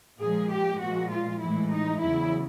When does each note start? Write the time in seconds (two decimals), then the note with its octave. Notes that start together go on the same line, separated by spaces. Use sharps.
0.21 A#2 F3 G#3 G#4
0.51 G4
0.81 A#2 F3 G#3 F#4
1.11 F4
1.41 A2 E3 G#3 E4
1.72 D#4
2.01 E2 C#3 F#3 E4